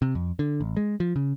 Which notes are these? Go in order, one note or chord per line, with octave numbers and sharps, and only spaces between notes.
C3
F2
D3
A1
G#3
F3
C#3